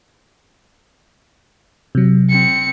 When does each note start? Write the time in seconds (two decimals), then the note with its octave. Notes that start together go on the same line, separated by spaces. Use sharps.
1.95 C3 F#3
2.30 C4 C#7